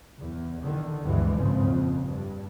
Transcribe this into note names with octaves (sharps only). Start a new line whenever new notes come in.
E2
E2 D3 D#3
G#1 D2 G2 E3 G#3
A#1 G#2 C#3 F3 C4
F2
G2